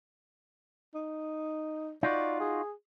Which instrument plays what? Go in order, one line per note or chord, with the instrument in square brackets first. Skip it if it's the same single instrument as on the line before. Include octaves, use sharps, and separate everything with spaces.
[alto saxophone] D#4
[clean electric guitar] D#4 F4 F#4 [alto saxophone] D5
[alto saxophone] G#4